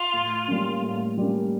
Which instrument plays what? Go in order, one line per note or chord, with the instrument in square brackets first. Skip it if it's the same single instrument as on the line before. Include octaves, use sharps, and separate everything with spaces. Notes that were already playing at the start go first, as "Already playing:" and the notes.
Already playing: [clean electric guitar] F4
[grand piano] A2
G3 A#3 C#4
A2
G3 A#3 C#4